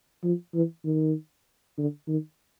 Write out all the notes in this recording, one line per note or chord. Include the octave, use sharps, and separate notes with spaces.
F3
E3
D#3
D3
D#3